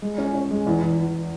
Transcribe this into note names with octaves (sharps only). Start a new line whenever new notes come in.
G#3
C#4
C#4
G#3
E2
E2
E2